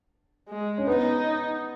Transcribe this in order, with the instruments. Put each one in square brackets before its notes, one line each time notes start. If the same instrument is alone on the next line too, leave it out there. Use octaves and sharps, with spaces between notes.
[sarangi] G#3
[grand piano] C#4
[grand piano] B3 [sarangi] D#4